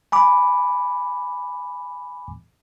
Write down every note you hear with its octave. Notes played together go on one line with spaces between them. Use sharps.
G#5 B5 D6